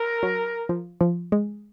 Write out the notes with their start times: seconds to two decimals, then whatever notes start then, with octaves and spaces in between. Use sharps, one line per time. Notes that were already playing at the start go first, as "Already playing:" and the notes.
Already playing: A#4
0.23 F#3
0.69 F3
1.01 F3
1.32 G#3